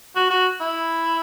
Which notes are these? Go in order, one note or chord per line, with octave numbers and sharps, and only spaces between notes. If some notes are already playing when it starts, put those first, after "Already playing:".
F#4
F#4
E4